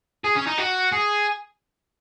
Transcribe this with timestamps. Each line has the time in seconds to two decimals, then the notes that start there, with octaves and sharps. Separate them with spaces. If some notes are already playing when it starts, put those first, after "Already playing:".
0.24 G#4
0.36 C#4
0.47 D#4
0.58 F#4
0.92 G#4